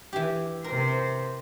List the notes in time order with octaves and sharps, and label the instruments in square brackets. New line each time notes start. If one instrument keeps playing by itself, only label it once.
[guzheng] E3 G4
[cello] C3 C5 [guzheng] A#4